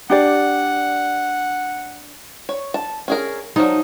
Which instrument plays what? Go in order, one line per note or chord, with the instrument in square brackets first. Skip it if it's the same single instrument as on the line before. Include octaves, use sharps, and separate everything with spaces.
[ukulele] D4 G4 D5 [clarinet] F#5
[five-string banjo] C#5
A5
C#4 G#4 A#4
[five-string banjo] D#3 F3 F#3 [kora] D#4